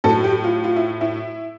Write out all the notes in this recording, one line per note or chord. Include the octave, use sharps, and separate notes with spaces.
A2 F#3 A4
G4
F4
F4
E4
E4